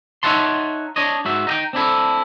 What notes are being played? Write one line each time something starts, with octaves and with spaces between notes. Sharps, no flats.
D#4 C#5 E5 F#5 A5 C6
D4 C#5 D#5
G#2 F#4 E5
D#4 D#5 G5
C4 D4 E4 A4